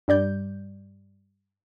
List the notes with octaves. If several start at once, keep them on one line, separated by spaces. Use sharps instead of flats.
G2 G3 D5 G6